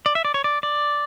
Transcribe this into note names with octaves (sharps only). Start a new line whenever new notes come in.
D5
E5
D5
C#5
D5
D5